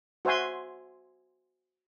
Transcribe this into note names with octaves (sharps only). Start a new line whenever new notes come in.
F#4 C5 E5 G#5 C6